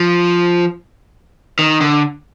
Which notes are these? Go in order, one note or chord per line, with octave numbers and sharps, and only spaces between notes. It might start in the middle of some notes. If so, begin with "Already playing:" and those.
Already playing: F3
D#3
D3